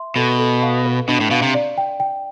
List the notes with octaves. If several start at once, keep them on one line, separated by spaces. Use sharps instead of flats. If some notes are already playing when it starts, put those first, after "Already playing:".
Already playing: E5 C6
B2 A4
A4
F5
B4
B2 D4
A2
B2 F5
C3
D5
G5
G5